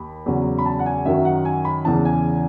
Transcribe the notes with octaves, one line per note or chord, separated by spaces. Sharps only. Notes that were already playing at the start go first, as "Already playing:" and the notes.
Already playing: D#2 B5
E2 C#3 F#3
B5
A5
F#5
G#5
F#2 D#3 F#3 E5
F#5
G#5
B5
E2 C#3 E3 A5
G#5